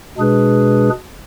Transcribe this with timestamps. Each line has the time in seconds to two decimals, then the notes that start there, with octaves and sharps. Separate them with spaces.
0.17 B2 G#3 D4 G#4 B4